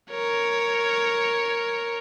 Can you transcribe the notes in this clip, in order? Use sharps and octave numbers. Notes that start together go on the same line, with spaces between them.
A#4 C#5